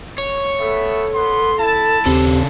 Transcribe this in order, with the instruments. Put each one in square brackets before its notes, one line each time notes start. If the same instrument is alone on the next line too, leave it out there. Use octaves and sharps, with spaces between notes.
[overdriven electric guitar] C#5
[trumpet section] A3 B3 E5 [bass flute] A4
[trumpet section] B3 C6
E4 A5
[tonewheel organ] D#2 C4 [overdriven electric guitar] C#3 A4 [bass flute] G4